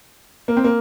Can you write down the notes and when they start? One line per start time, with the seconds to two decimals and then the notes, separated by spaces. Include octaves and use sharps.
0.48 A#3
0.57 C4
0.64 A#3